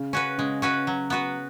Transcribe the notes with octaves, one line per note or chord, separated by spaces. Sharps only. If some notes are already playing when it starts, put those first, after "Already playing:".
Already playing: C#3
C#4 F#4 B4
C#3 G#3
C#4 F#4 B4
F#3
B3 F#4 B4